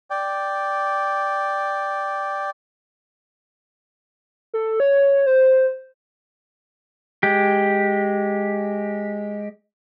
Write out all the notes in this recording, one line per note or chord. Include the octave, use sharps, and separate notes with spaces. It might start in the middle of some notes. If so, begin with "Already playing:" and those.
D5 G5
A4
C#5
C5
G#3 G4